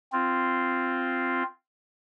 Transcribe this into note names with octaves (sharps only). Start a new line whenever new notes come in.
C4 F4